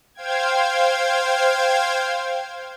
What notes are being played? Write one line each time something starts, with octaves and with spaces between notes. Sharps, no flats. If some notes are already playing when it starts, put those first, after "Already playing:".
C5 F5 G5 G#6